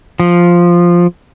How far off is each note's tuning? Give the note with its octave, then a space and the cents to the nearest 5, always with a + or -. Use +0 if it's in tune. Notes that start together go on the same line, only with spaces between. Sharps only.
F3 +0